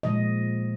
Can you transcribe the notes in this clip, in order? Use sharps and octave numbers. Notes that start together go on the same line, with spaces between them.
A#2 F3 G#3 D#5